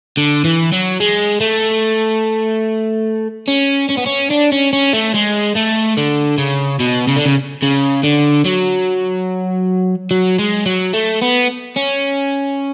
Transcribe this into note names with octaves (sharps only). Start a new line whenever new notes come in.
D3
E3
F#3
G#3
A3
C#4
C#4
B3
C#4
D4
C#4
C#4
A3
G#3
A3
D3
C#3
B2
C#3
D3
C#3
C#3
D3
F#3
F#3
G#3
F#3
A3
B3
C#4